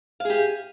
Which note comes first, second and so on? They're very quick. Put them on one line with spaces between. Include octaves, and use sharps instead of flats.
F5 G#4 G4